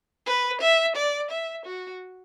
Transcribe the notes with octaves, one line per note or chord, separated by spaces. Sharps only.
B4
E5
D5
E5
F#4